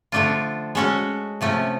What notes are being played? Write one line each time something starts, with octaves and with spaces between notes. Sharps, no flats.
D3 F3 A3 D4 F4
G#3 C#4 F#4 A4
C3 F3 A3 C#4